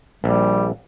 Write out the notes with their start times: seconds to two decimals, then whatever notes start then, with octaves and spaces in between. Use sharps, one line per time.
0.24 A#1 G3